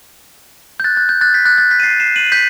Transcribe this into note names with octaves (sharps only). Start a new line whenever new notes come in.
G6
F#6 A6
F#6 A6
G6
F#6 A6
G6 B6
F#6 A6
F#6 A6
G6 B6
D#7
A6 C7
C7 E7
D#7 F#7
G6 B6